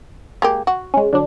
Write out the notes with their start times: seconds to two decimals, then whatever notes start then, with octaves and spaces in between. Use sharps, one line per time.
0.42 G#3 A#3 G4
0.67 F#4
0.94 G#3 C#4
1.13 D3 F#3 D4